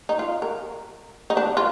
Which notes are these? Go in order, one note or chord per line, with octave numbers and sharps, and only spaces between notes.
D#4
F4
A#4
D#4
D4
F4